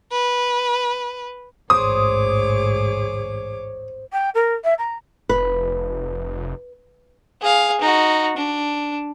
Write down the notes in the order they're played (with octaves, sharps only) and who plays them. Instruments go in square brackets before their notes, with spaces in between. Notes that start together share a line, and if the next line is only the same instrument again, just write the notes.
[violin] B4
[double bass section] A1 D2 G#2 [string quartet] G#4 C#5 D6 [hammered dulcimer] C5 [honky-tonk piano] D#6
[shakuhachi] G5
A#4
E5
A#5
[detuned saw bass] F1 [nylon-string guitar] B4
[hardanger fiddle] G#4 F5
D#4 F#4
D4